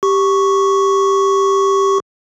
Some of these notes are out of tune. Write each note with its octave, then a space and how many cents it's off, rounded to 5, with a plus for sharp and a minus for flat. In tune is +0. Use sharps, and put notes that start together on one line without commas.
G4 +0 C#6 +0